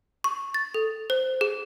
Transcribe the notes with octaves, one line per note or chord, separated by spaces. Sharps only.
C#6
A6
A4
C5
G#4